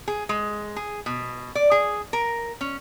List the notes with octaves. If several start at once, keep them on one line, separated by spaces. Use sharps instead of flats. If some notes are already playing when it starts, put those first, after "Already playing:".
G#4
G#3
G#4
B2
D5
G#4
A#4
C#4